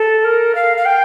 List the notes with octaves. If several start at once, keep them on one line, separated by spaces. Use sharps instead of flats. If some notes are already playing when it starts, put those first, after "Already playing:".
Already playing: A4
A#4
F5
F5
G5